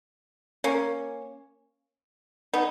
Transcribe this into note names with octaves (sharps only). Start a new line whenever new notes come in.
A#3 C#4
B3 D#4